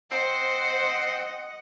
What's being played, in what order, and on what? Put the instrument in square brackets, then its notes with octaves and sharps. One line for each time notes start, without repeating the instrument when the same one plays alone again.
[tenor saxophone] C4 [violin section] C5 [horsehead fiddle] D#5 F#5